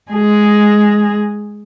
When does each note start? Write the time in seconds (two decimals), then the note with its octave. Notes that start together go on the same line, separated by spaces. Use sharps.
0.11 G#3 G#4